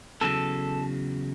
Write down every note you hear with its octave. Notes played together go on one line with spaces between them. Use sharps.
E2 C#3 F#3 A4